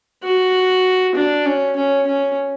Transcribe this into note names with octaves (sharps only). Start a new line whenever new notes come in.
F#4
D4
C#4
C#4
C#4